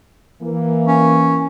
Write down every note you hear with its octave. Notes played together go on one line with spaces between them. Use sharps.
E3 A#3
C#4